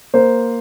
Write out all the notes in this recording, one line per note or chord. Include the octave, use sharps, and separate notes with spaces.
A#3 C5